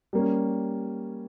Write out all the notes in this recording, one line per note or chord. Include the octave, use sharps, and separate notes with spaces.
G3 A#3 C#4